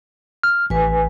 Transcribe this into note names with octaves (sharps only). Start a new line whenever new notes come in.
F6
A1 B4 G#5